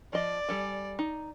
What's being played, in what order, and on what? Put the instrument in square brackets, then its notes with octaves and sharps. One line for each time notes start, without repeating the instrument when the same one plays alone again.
[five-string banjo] F3 D#5 [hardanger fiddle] D5
[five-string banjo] G3 A4 G#5
D#4